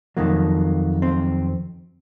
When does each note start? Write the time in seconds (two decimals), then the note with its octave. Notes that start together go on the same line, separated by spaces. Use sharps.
0.17 F2 D#3 F#3 A#3
1.02 C4